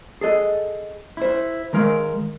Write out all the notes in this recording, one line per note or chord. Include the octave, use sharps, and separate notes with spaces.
G#4 A4 D#5
E4 C5
D#3 G#3 A#4 F5